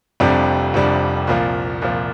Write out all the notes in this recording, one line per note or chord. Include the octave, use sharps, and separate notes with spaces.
F1 F2 C3 G3 D4
F1 F2 C3 G3 D4
C2 A#2 F3
C2 A#2 F3